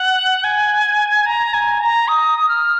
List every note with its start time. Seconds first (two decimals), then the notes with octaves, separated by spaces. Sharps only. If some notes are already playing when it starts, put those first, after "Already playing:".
Already playing: F#5
0.44 G#5
1.26 A#5
1.54 G#5
1.80 A#5
2.08 D#6
2.49 F6